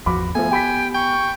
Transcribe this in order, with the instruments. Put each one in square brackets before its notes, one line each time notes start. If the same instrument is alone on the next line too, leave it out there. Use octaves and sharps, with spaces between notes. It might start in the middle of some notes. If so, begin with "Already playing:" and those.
[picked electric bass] G#1 E2 F3 [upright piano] F#4 B5 D6
[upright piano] F3 A3 [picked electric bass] B3 [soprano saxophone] G#5
[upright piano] G4 B5 B6 [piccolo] G5
[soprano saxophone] G5 [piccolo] C#6